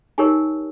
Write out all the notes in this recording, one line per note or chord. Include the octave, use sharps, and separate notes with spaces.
D#4 G4 A#4 C#5 G#5